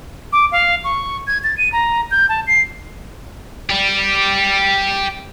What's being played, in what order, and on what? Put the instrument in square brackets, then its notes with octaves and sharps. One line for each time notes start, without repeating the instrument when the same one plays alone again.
[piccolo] D6
F5
C#6
G#6
A6
D#7
A#5
G6
A5
C7
[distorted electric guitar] G4 D5